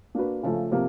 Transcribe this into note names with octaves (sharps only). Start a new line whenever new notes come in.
A#3 D4 F#4 B4
C#3 F3 A3 C#4
C3 F3 A#3